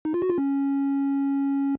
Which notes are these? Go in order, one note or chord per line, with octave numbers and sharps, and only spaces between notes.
D#4
F4
F#4
F4
C#4